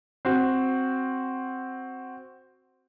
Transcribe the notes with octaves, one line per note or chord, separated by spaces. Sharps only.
C4 F#4